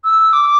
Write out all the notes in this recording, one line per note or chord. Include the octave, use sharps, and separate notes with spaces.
E6
D6